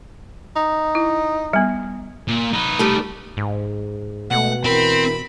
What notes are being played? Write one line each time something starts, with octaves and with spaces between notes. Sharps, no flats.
D#4
E4
G3 B3
A#2
D#4 B4
G3 A3
G#2
B2 G#3 A3 F#5
E3 C4 A#4 B5